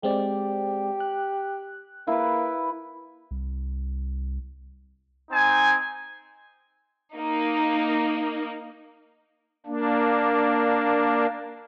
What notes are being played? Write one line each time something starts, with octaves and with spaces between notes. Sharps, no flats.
G#3 C4 G4 D5
F#6
A#3 E4 B4
C2
C4 D#4 G#5
A#3 D#4
A#3 D4